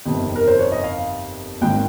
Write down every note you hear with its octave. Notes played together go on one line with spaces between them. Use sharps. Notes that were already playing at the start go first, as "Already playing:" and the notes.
G1 F2 C3 D#3
A#4
C5
C#5
D#5
F5
G#1 G#2 D#3 G5